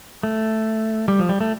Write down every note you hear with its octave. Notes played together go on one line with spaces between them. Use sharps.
A3
G3
F3
G3
A3